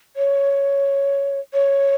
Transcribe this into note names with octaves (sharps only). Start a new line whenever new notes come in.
C#5
C#5